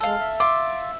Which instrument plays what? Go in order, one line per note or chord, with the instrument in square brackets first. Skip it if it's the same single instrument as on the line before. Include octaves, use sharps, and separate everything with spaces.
[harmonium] G#3 [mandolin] A4 F5
[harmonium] E5
[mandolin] F4 [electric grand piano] D6